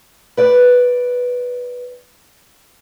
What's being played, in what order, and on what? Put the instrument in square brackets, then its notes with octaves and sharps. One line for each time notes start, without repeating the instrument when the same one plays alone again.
[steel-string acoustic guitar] B4 D5